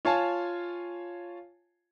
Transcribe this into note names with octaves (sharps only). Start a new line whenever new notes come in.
F4 C#5 F5 G#5 A5